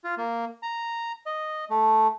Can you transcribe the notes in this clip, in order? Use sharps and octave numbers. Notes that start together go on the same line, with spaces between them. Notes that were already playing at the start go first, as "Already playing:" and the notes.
F4
A#3
A#5
D#5
A3